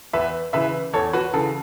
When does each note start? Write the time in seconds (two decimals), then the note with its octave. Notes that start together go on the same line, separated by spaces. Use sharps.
0.13 E2 B4 E5
0.53 C#3 E3 B4 E5
0.93 E2 A4 C#5
1.13 F#4 B4
1.34 C#3 E3 A4